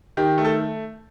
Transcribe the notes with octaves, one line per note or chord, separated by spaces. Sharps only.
D#3 G4
A3
A4